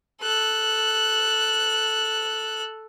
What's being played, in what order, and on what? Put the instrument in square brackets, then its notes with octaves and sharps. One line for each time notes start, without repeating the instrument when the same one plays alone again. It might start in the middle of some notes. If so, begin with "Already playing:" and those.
[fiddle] A4 F#6